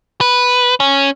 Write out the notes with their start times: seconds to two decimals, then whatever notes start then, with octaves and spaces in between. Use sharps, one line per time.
0.21 B4
0.80 C#4